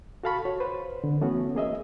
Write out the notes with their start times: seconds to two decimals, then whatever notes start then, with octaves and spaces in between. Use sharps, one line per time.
0.24 F#4 A4 F5 A5 B5 C#6
0.45 F#4 C#5
0.60 B4 C5
1.04 D3
1.21 E3 A3 B3 C#4 F#4
1.55 A#3 G#4 D#5 E5